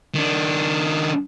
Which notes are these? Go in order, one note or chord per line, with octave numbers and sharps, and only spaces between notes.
D#3 D4